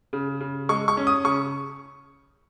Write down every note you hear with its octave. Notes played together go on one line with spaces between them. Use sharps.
C#3
C#3
G#3 C#6
C#6
C#4
D#6
C#3 C#6